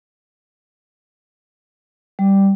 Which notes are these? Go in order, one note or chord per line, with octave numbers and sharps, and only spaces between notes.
G3